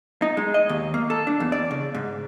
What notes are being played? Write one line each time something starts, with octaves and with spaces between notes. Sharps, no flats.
D#4
G#3
D#5
D#2
A#3
A4
D4
E2
D5
C#3
G#2